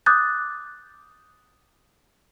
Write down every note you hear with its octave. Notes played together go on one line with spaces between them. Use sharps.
D6 D#6 F#6 G6 A6